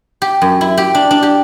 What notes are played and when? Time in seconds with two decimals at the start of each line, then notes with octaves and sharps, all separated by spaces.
0.22 G4
0.42 F#2
0.61 E4
0.78 G4
0.95 D4
1.11 D4
1.23 G4